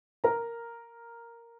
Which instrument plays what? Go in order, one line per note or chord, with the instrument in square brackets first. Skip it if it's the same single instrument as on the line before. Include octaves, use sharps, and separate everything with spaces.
[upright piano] A#4 A#5